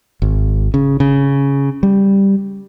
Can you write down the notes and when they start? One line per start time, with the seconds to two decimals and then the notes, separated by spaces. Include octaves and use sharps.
0.22 G#1
0.74 C#3
1.00 C#3
1.83 G3